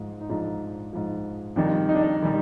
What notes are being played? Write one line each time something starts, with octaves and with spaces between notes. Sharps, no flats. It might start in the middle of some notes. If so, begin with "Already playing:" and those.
Already playing: G#2 F3
D#4
G#2 F3 D4
G#2 F3
F2 D#3 G3 D4
D#4
D4
D#4
D#3 G3